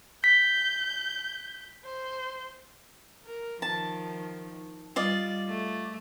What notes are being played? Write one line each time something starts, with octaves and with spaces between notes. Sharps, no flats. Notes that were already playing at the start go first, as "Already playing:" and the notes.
G6 B6
C5
A#4
D#3 F3 A5
G3 F4 D5 D#5
A3